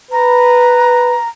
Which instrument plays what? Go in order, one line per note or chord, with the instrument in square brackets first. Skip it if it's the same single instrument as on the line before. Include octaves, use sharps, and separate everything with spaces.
[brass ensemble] B4 [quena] A#5